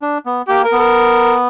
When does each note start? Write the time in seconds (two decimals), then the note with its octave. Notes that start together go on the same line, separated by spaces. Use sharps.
0.02 D4
0.26 B3
0.48 A#3 G4
0.64 A#4
0.72 B3
0.79 A#4